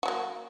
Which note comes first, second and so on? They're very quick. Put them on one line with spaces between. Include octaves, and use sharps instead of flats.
F#4 F#3 A#3